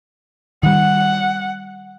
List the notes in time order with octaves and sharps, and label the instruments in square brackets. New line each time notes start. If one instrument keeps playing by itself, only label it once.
[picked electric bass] D#3 G3 [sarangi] F#5